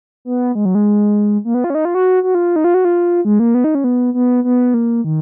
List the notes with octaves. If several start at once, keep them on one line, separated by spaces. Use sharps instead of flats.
B3
G#3
F#3
G#3
A#3
B3
F4
C#4
D#4
F4
F#4
F#4
F4
D#4
F4
F#4
F4
G#3
A#3
B3
D#4
C#4
B3
B3
B3
A#3
D#3